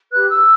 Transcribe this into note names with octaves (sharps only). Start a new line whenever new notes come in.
G4 B4 F#6
E6